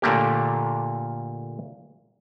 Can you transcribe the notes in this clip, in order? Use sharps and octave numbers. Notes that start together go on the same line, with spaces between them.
A#2 D3 A3 A#3 G4